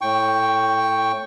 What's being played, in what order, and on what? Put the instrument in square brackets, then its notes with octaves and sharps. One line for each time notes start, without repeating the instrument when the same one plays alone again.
[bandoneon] A2 G5 C#6